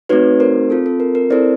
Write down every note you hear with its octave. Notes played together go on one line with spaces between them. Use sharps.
A3 C4 D#4 F#4 B4 C#5
A#4 C5
C4 F4 A4
A4
A#4
A#4
C4 E4 A4 C5 D5